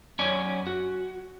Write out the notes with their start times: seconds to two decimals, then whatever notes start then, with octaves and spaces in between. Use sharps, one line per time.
0.19 F#2 C#4 C#5 D5 G#5
0.67 F#4